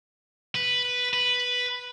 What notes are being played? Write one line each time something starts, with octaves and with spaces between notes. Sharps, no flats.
B4
B4